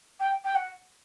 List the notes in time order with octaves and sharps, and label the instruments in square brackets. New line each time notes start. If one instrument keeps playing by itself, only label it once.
[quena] G5
G5
F#5